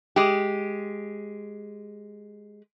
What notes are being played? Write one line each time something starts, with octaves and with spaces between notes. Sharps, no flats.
G#3 G4